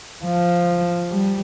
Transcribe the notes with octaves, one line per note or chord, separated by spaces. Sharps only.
F3
G3